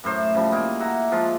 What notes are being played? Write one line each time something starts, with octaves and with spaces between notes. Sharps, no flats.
F#2 A2 C5
C#3 F3 G3
A#3 D#4
E5 F#5 A#5
F3 G#3 F4